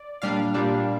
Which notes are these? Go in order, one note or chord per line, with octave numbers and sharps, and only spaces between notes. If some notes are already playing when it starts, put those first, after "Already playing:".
Already playing: D5
A#2 G3 D4 F5
A#2 G3 D4